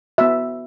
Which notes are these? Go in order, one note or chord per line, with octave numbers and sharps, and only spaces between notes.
B3 F#4 E5